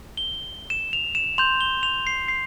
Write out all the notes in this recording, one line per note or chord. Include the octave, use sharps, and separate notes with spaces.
G7
E7
F7
E7
C6 G6 F7
G7
F7
C7
C7